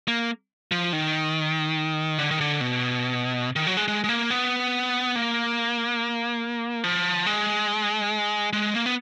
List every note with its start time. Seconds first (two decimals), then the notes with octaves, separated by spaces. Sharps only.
0.08 A#3
0.71 F3
0.93 D#3
2.19 D3
2.31 D#3
2.41 D3
2.61 B2
3.56 D#3
3.67 F#3
3.77 G#3
3.88 G#3
4.04 G#3
4.09 A#3
4.31 B3
5.15 A#3
6.84 F3
7.26 G#3
8.53 G#3
8.74 A#3
8.86 B3